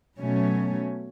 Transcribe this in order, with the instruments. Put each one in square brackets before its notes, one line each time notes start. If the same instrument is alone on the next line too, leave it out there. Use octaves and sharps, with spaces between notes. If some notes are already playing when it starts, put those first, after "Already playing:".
[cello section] B2 F#3 A3 C#4